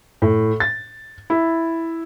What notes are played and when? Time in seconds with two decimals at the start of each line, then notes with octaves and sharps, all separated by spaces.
0.22 A2
0.60 A6
1.30 E4